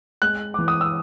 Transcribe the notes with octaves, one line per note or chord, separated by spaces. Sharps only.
G#3 F#6
E3 D6
D#6
E6